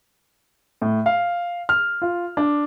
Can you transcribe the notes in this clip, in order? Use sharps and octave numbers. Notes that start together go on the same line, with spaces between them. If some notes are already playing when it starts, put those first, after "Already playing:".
A2
F5
F6
F4
D4